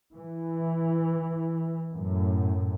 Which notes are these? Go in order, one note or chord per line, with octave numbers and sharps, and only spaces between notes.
E3
F#2 A2